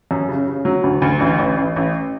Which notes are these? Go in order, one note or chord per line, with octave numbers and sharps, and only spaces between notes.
F#2
C#3
C#3
F#3
D2
D2
A1
A1
A1
A1